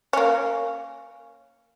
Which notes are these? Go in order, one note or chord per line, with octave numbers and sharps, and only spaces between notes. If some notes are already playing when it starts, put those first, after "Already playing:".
A#3 C#4